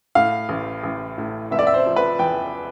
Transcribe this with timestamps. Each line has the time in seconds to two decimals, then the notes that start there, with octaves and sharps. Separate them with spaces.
0.15 A2 F5
0.49 A1
0.84 A1
1.18 A2
1.51 F1 E5
1.59 D5
1.67 E5
1.74 C5
1.86 F3
1.96 B4
2.19 E2 G5